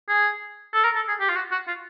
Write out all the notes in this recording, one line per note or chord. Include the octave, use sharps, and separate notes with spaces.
G#4
A4
A#4
A4
G#4
G4
F4
F#4
F#4
F4